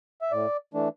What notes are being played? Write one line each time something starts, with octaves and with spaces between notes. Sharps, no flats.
E5
A2 D5
E3 A3 D4